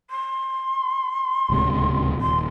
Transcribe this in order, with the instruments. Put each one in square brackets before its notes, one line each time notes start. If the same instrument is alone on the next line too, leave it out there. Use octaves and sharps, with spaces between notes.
[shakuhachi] C6
[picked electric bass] D1 C#2 C3
[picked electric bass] D#1 [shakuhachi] C6